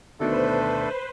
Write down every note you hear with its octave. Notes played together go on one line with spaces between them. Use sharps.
D2 B2 D#3 A3 D4 A4 B4 C5